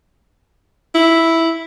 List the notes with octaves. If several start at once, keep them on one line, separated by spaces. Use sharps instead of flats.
E4